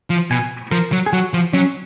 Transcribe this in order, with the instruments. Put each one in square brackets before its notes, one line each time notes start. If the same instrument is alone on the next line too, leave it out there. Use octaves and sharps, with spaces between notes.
[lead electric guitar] F3
[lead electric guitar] B2 [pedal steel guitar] G#5
[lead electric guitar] F3 [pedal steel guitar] A#4
[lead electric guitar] F#3
[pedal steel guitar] G#4
[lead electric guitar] F#3 [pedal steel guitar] F#4
[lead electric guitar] F3
[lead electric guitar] F#3 [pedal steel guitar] C#4